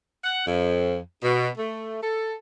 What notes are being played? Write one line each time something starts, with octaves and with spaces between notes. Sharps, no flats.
F#5
F2
B2
A3
A4